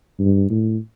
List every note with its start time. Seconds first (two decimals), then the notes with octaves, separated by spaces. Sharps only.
0.19 G2
0.50 A2